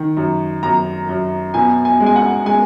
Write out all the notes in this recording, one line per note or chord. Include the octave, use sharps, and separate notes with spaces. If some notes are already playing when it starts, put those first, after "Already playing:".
Already playing: D#3
F#2
F#2 A#5
F#2
B2 G#5
G#5
G#3
G#5
F#5
G#3 G#5